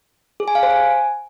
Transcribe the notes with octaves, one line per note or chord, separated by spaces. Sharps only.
G#4
G#5
F5
C5
G#5